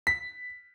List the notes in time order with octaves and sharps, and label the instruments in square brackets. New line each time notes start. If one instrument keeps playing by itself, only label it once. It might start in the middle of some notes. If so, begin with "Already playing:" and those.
[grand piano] B6